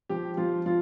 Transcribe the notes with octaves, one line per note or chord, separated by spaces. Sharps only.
F3 G4
F3 F4
F3 F4